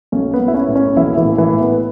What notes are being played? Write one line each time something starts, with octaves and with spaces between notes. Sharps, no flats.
B1 C#4
B3
B1
E4
C#4
A2
C#4
B1 E3 E4
E3 E4
A2
E3 E4
A2
B3